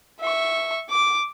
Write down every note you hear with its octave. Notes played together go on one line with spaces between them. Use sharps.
E5 C#6
D6